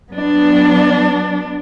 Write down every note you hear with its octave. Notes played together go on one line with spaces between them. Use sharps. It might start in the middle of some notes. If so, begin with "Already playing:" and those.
F#3 B3 D4